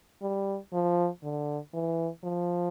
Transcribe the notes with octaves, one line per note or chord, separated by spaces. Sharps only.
G3
F3
D3
E3
F3